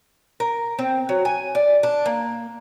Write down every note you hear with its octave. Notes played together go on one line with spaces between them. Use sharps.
A#4
C4
F#3
G#5
D5
D4
A#3